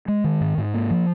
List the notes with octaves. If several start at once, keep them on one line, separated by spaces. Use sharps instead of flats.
G#3
D#3
G#2
G#2
A#3
F3